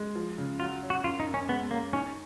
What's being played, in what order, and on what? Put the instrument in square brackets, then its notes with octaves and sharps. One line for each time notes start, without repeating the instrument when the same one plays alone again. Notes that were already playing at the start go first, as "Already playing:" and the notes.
Already playing: [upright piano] G#3
F3
C#3
[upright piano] F#3 [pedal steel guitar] F4
[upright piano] C#4
[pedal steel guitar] F#4
[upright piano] F#2 [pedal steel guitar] F4
[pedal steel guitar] D#4
[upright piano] F#2
[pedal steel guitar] C#4
[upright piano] G#3 [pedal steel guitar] B3
[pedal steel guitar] A#3 [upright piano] C#4
[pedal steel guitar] C#4 [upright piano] D#4